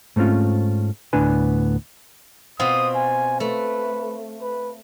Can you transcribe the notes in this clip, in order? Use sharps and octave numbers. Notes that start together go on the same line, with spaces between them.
G#2 A3 C4 C#4 F4
D2 A2 B3 D4 B4 G#5
B2 C4 F4 D#6
G#5
A3 B4
B4